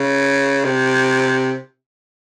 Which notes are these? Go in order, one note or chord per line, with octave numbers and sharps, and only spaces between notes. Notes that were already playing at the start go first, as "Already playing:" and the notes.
Already playing: C#3
C3